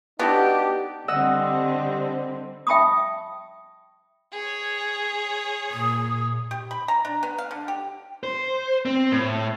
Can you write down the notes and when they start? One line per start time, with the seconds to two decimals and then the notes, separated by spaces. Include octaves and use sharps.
0.19 B3 D4 D#4 F#4 G4 A4
1.08 D3 G3 C4 D#5 F#5 E6
2.67 E5 G5 A5 B5 C#6 D#6
4.32 G#4 C#5
5.71 A#2 D#6
6.51 G4
6.71 B5
6.88 A#5
7.05 D4
7.23 B3
7.38 F5
7.51 D3
7.68 G4
8.23 C5
8.85 C4
9.12 A2